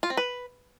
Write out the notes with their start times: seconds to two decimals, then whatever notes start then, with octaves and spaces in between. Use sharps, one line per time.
0.03 F4
0.10 C4
0.17 B4